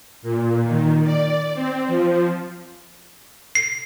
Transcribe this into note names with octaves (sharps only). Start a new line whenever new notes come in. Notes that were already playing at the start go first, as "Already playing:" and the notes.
A#2
D#3
D5
C4
F3
C7